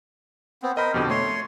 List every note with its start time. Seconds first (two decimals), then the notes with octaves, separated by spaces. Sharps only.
0.62 B3 C4
0.77 A#4 C5 D#5 B5
0.94 F2 B2 D3 G4
1.10 A3 C#5 C6